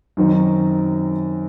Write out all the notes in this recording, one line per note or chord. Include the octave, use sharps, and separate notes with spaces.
F#2 D#3 F#3 C4 D#4